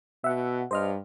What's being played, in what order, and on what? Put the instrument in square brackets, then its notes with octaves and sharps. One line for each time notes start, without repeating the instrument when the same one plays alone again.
[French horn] B2 [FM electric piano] E5 F#5
[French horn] G2 [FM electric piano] C5 D#5 F6